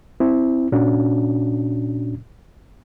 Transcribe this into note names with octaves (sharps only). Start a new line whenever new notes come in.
C4 E4
A#2 C#4 D4 F#4